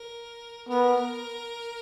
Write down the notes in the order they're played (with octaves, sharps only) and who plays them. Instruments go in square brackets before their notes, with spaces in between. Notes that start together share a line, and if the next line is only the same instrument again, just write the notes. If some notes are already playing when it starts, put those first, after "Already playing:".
Already playing: [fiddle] A#4
[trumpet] B3 [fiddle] A#4